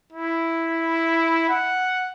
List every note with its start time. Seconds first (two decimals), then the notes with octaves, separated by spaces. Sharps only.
0.13 E4
1.49 F#5